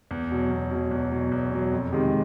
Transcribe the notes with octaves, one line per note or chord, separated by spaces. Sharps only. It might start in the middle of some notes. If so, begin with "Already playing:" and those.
E2
B2 F#3
E2
B2 F#3
E2
B2 F#3
E2
B2 F#3
F2
C3 D#3 G#3